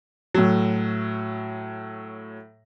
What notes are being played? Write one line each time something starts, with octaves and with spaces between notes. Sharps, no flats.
A2 F#3